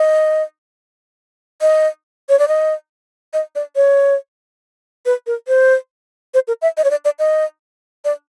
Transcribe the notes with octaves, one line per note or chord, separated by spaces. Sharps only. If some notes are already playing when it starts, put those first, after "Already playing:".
Already playing: D#5
D#5
C#5
D5
D#5
D#5
D5
C#5
B4
A#4
C5
C5
A#4
E5
D#5
C#5
D5
D5
D#5
D5